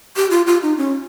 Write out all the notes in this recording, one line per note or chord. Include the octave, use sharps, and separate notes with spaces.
G4
F4
F4
D#4
C#4